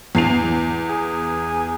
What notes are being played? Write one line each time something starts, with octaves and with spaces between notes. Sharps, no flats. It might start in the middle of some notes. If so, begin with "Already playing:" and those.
E2 C7 F7
G#4